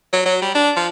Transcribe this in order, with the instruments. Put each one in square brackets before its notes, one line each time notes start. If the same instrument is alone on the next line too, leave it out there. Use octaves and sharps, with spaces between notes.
[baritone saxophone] F#3
F#3
G3
D4
F3